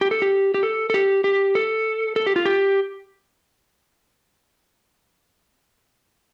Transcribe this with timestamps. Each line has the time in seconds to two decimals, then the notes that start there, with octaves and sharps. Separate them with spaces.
0.01 G4
0.11 A4
0.22 G4
0.54 G4
0.63 A4
0.90 A4
0.94 G4
1.24 G4
1.55 A4
2.16 A4
2.26 G4
2.36 F4
2.46 G4